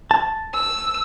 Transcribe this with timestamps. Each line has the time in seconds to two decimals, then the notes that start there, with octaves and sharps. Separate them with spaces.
0.11 A5
0.54 E6